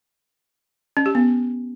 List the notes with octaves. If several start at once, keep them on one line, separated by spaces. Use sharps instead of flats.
C#4
G4
B3